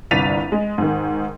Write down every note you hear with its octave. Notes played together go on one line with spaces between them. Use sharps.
G1 C2 A6 B6 D#7 F7
G#3
G#2 D#3